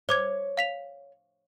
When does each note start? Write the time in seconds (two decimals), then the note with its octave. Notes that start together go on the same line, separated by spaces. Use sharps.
0.09 C5 C#5 D6 G#6
0.57 F5 B6 F7